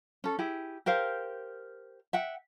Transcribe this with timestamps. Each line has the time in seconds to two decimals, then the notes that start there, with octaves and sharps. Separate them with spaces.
0.24 C#4 A4
0.39 E4 G4 G#4
0.86 G4 A#4 C5 F5
2.13 E5 F#5 G5